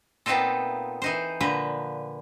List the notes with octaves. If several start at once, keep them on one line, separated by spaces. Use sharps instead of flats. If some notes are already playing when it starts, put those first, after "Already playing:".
A#2 B3 C4 D#4 F4 A4
E3 D#4 C5
A#2 D3 F3 B4 A#5